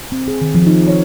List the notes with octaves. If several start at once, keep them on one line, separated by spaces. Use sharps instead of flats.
C4
G#4
D#3
F3
D#4
C#5